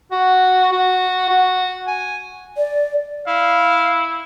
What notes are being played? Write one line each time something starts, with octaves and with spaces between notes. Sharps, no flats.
F#4
F#4
F#4
G#5
D5
E4 F5